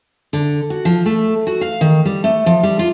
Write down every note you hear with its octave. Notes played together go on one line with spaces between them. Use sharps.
D3
F#4
F3
A3
F#4
F5
D#3
G3
A3
F3
G3
F4